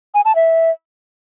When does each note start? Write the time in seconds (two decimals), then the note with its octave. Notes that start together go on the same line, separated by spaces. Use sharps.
0.15 G#5
0.25 A5
0.36 E5